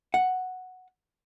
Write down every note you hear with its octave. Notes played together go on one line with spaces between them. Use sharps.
F#5